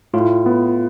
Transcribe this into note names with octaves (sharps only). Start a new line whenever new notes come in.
A2 F4
B3